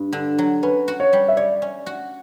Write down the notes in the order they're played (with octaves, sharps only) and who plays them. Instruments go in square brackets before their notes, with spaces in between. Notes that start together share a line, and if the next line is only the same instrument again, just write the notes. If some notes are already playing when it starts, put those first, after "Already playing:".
Already playing: [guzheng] G2
D3
F#3
[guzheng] C#4 [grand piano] B4
[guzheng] F#4
[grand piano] C#5
[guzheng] G3
[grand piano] E5
[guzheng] C#5 [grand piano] D5
[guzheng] C#4
F#4